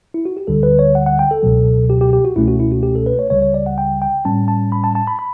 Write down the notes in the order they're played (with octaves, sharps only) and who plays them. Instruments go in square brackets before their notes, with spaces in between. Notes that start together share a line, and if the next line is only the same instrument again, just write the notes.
[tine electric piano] E4
F#4
G4
D2 D3 G3 A4
B4
C#5
F#5
F#5
G5
A4
C#2 B2 F#3
G4
G4
G4
F#4
C#2 B2 A3 C#4 E4
F#4
E4
F#4
G4
A4
B4
C#5
C#2 C#3 G3 C#5
C#5
D5
F#5
G5
G5
A2 G3 C#4 A5
A5
B5
A5
A5
B5
B5